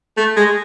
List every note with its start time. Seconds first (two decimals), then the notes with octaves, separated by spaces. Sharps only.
0.17 A3
0.37 G#3